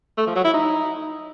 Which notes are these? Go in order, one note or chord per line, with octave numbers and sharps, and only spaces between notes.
A3
F3
F#3
E4
D#4